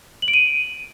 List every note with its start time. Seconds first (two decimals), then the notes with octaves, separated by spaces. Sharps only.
0.22 F#7
0.28 D7
0.34 D#7